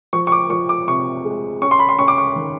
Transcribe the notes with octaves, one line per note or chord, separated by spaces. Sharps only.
F3 C#6
C#6
D6
F3 C#6
D6
C3 C#6
G#3
C#4 C#6
C6
B5
C6
C#4 C#6
D6
C#6
D#3